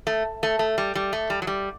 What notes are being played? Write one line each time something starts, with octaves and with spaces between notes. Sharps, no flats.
A3
A3
A3
G3
G3
A3
G3
F#3
G3